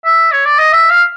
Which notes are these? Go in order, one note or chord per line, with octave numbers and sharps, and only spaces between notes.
E5
C#5
D5
D#5
E5
F5